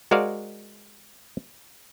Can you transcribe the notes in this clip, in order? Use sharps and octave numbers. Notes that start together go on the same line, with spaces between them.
G#3 F#4 A#4 C5 D5 F5